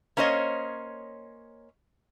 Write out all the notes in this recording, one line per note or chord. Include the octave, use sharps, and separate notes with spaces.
A#3 C#4 C5 C#5 D#5